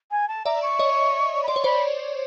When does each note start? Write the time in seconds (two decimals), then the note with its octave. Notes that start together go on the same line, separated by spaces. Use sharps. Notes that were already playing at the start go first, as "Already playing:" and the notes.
0.11 G#5
0.28 A5
0.45 D5 E5 A#5
0.62 C#6
0.79 C#5 D#5
1.43 B5
1.48 D5 C6
1.56 C#5
1.64 C5 D5 B5